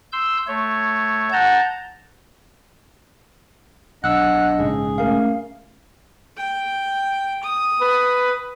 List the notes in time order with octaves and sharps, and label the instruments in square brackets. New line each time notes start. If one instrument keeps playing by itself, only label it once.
[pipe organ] C6 E6 G6
A3 C#5
[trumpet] F#5 [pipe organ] A5 A#5 G6
[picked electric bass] B1 [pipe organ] D4 D#5 [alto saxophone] F#5 [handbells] E6 F#6
[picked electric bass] A#1 G#2 C#3 [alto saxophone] G#4
[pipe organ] A3 C#4 [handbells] A#4 F5
[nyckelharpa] G5
D#6
[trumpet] B4